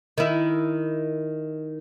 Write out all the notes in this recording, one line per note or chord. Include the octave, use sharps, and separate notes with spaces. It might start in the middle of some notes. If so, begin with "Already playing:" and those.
D#3 E4